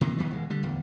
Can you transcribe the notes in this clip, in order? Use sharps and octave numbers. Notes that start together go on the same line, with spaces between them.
C3 D#3 E3 A#3
D#2 D#3 E3 B3
D#1 G#3
D3 G3
D1 E2